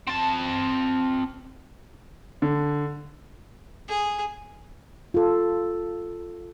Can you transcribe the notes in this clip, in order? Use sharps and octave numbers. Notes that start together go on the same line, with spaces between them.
C4 A5
D3
G#4
F4 A4